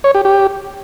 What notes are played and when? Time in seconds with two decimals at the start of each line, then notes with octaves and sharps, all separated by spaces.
0.04 C#5
0.15 G4
0.25 G4